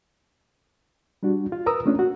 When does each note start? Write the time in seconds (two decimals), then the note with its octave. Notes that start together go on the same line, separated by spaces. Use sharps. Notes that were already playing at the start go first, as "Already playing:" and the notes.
1.23 G3 D4 F#4
1.52 F4
1.66 A#4 B4 A#5 D#6 E6
1.86 A3 A#3 C#4 D4 F4
1.99 F#4